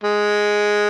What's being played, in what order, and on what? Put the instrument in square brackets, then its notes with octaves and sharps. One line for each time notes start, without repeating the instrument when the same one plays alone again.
[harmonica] G#3